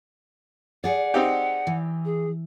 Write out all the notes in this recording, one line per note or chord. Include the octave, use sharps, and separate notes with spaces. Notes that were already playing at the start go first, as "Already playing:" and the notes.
G#4 D5 F#5
C4 D#4 G4
E3
G#4